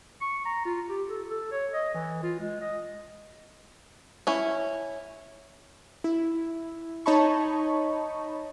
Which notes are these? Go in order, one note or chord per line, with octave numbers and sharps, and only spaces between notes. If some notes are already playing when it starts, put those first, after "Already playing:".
C#6
A#5
F4
G4
A4
A4
C#5
D#5
E3
F4
G#3
D#5
C#4 E4
E4
D#4 C#5 D#5 A5 B5 C#6